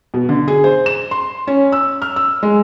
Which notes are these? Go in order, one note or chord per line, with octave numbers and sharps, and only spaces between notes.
B2
D3
G#4
C5
E7
C6
C#4
E6
F6
E6
G#3